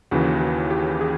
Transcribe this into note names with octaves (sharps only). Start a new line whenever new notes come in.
D#2 C#3 E3 F#4
F#4
G4
G#4